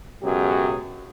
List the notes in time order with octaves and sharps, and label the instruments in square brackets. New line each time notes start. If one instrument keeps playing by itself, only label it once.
[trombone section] C#2 F#2 B2 F#3 G4 G#4